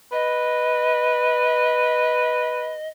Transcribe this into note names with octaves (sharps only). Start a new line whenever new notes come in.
B4 D#5